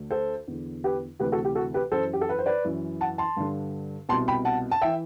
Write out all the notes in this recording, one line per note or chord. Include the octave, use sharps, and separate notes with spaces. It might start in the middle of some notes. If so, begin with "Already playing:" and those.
Already playing: D2 D3
A4 C5
E2 D3
G4 B4
D2 C3 E3 G4 B4
F#4 A4
G4
F#4 A4
G4 B4
F#2 E3 A4 C5
G4
A4
B4
C5
B4 D5
F#2 E3
F#5 A5
A5 C6
G2 D3
C2 B2 A5 C6
G5 B5
F#5 A5
A5
E3 E5 G5